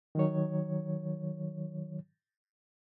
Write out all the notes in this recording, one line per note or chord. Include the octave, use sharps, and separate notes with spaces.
D#3 F#3 C#5